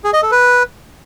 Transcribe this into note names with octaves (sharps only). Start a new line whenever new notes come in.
G#4
D#5
A4
B4